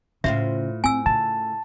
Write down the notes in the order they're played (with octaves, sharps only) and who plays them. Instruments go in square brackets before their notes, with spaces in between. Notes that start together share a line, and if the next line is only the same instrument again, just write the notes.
[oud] A2 F4 C5 [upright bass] C#3 [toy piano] E5
[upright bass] C4 [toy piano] G#5 E6
[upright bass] C#3 [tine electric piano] A5